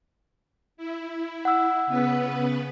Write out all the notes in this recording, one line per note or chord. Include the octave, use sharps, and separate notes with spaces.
E4
F#5 E6
C#3 B3 B4